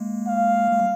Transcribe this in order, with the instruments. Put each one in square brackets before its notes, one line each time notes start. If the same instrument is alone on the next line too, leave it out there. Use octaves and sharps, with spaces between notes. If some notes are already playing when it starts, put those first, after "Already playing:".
Already playing: [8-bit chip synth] G#3 A#3
[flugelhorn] F5
[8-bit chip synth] G#3
G3